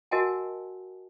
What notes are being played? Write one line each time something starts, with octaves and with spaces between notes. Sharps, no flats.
F#4 A#4 D#5 F#5 G#5 A5